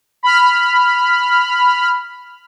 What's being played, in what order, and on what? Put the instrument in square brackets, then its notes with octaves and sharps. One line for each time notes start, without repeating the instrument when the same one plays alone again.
[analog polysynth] B5 F6